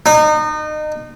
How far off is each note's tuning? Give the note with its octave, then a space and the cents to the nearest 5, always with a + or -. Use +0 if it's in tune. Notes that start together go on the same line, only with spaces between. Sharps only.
D#4 -30